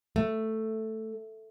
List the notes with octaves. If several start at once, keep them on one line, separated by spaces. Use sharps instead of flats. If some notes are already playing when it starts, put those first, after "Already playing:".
A3